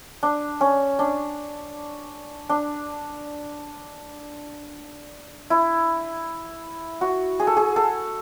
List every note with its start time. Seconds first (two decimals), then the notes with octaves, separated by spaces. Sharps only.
0.23 D4
0.61 C#4
0.99 D4
2.50 D4
5.50 E4
7.01 F#4
7.40 G#4
7.47 A4
7.57 G#4
7.76 A4